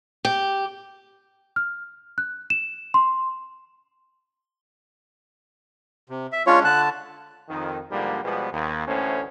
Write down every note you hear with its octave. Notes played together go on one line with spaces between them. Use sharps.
G4
F6
F#6
E7
C6
C3
E5
G#3 C#4 D4 F4 C#5
D3 A5 F#6
F2 D#3
G#2 D3 F3 G3 A#3
B2 F3 G3 G#3 B3
D#2
A1 D2 A2 C#4 C5